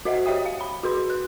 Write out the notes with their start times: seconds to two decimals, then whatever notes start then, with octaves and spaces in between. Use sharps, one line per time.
0.05 F#4 C5 D#5 E5 F#5
0.26 G4 C#5 D#5 E5 G5 D#6
0.46 F5
0.61 B5
0.83 F#4 G#4 B4 C6
1.10 F#6